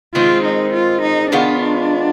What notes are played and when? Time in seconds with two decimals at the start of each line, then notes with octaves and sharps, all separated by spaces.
0.15 D#3 G#3 C4 F4
0.45 D#4
0.74 F4
1.02 D#4
1.32 D#3 G#3 B3 D4 F4